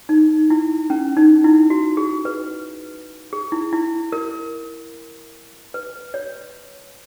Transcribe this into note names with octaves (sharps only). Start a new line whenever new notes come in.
D#4
E4
C#4
D#4
E4
F#4
G#4
B4
G#4
E4
E4
A#4
B4
C#5